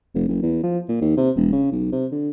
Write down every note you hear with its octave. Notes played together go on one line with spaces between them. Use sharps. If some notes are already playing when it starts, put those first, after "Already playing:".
F1
F#1
E2
F3
A#2
D#2
C3
E1
C#3
B1
C3
D3